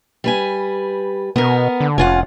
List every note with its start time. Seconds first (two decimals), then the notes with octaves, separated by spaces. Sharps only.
0.24 G3 B4 G#5
1.36 B2 B3 A#4
1.80 D3
1.98 F1 C#4 F4 F#5